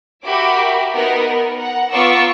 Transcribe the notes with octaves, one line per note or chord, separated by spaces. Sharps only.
F#4 G4 A#4 E5 B5 D6
B3 D#4 A#4 B4
A#4
F#5 A#5
B3 F4 A#5 C#6 D6 E6